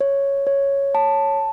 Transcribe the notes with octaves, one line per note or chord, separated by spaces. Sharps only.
C#5
C#5
A5